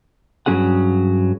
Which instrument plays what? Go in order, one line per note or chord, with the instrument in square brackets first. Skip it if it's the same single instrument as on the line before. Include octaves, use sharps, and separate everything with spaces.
[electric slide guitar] G2 F#3 C#4 G#4 F#5